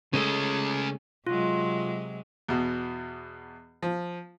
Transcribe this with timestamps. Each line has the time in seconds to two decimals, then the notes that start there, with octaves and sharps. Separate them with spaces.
0.13 C#3 G#3 A3 C#4 D#5
1.27 C3 F#3 G#3 F4
2.49 E2 B2
3.83 F3